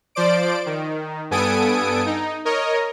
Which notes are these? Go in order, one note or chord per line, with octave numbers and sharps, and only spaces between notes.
F3 C5 D5 D7
D#3
G2 B3 A4 G#5 D#6 D7
D#4
A#4 C#5 D#5